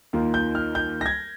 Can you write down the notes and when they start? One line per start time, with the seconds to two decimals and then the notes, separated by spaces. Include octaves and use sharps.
0.13 D#2 D#3 A#3 F4
0.34 G6
0.55 F6
0.75 G6
1.01 A#6
1.06 G#6